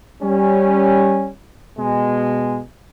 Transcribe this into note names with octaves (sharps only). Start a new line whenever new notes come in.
G3 C#4
B2 G#3